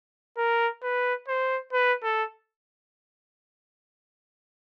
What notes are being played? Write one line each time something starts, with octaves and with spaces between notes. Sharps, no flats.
A#4
B4
C5
B4
A4